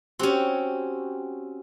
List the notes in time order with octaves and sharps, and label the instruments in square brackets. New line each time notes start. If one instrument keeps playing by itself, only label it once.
[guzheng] C4 C#4 [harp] F#4 G4